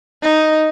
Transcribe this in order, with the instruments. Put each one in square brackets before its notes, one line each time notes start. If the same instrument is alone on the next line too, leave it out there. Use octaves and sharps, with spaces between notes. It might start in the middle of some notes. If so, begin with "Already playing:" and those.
[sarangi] D#4